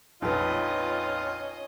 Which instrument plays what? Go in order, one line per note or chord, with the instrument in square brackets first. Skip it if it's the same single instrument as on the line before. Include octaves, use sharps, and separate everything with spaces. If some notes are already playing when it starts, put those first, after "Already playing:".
[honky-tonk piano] A#1 F2 [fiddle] C#4 D#5 [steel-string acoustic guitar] D#4 B4 [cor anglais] F4